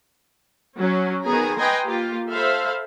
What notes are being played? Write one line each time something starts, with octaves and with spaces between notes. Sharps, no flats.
F#3 C#4
D#3 B3 G#4 G#5 A#5
B4 D#5 G5 G#5 A#5 C6
A#3 F4 G4
A4 C5 E5 F5 B5